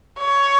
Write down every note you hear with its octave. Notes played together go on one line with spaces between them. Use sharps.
C#5